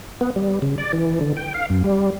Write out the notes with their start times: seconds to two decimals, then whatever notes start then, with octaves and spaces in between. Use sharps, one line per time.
0.21 B3
0.36 G3
0.62 C#3
0.78 D5
0.93 E3
1.21 D3
1.37 G5
1.54 F5
1.70 F#2
1.84 G3